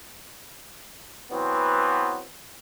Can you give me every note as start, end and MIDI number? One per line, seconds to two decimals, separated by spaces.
1.31 2.23 52
1.31 2.23 54
1.31 2.23 59
1.31 2.23 60